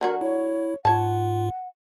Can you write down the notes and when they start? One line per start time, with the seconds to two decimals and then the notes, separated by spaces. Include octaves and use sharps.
0.01 D3 F#3 F#4 A#4
0.21 E4 C#5
0.85 G#2 F4 C#5 F#5 A5